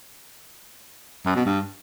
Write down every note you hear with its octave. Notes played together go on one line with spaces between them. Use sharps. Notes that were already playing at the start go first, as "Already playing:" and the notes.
F#2
B2
G2